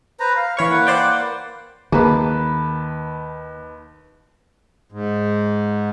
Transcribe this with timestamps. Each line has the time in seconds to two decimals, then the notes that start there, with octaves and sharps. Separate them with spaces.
0.20 B4 C5 A#5
0.36 F5
0.57 E3 C#5 F5 B5 C#6
0.70 A#3 B4 F#5
0.87 C5 D5 G5
1.92 D#2 D#3 A#3 G#4 B4 A5 A#5
4.92 G#2